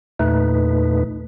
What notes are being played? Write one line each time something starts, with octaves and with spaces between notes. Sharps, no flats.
E2 A#2 A3 D#4 B4